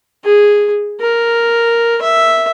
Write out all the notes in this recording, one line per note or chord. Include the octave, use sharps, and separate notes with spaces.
G#4
A#4
E5